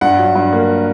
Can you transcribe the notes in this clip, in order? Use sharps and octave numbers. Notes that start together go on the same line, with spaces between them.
G2 F#5
F#3
G2
A#3